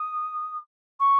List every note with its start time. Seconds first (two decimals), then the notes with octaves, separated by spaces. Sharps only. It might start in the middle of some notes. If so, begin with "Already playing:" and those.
Already playing: D#6
1.00 C#6